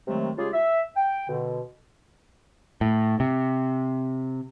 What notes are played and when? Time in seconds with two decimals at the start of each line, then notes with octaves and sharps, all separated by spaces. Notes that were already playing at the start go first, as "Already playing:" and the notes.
0.08 C3 D#3 F#3 G#3 A3
0.38 C#3 G#3 F4 G4 G#4
0.53 E5
0.96 G5
1.29 B2 D3
2.81 A2
3.20 C3